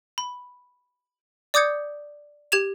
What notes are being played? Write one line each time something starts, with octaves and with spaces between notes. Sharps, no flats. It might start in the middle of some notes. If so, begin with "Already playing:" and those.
B5
D5 D6 D#6 G6 G#6 C#7
G4 G#6 E7 F7